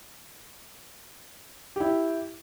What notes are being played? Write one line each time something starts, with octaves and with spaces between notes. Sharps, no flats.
E4 G4